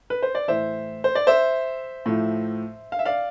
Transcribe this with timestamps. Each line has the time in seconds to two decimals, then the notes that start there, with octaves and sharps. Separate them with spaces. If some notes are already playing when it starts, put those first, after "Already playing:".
0.10 B4
0.23 C5
0.35 D5
0.48 A2 E3 C5 E5
1.04 C5
1.15 D5
1.27 C5 E5
2.06 A2 F3
2.92 F5
2.99 E5
3.06 D5 F5